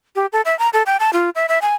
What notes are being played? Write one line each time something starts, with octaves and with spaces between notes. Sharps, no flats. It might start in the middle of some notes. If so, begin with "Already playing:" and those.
G4
A4
E5
A#5
A4
G5
A5
F4
E5
E5
G#5